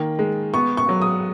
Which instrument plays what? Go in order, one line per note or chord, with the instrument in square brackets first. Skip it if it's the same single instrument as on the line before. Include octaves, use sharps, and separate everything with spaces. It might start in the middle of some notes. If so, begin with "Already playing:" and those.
Already playing: [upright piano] D#3 A#3
G#3
B3 C#6
C#6
F#3
D#6